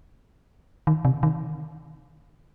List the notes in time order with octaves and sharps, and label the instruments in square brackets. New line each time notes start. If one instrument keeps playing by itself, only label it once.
[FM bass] D#3
C3
D#3